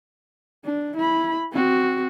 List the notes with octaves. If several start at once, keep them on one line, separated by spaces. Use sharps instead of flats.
D4
E4 B5
C4 F#4